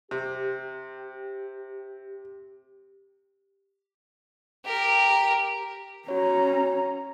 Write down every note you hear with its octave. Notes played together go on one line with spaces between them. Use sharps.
C3 G4
G4 A#4
C#4 F#4 C#5 A#5